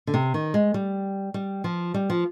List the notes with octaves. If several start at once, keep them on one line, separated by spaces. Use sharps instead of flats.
D3
C3
D#3
G#3
G3
G3
F3
G3
F3